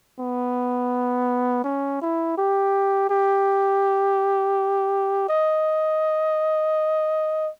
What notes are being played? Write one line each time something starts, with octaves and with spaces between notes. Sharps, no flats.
B3
C#4
E4
G4
G4
D#5